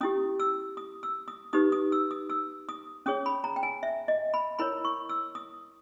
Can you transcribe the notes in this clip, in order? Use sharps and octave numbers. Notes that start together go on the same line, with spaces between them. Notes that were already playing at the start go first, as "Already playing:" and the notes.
C#4 E4 G4 D#6
E6
D#6
E6
D#6
D#4 G4 B4 D#6
D#6
E6
D#6
E6
D#6
C#4 G#4 C#5 D#6
B5
A#5
G5
G#5
E5
D#5
B5
E4 A#4 C#5 B5
C#6
E6
D#6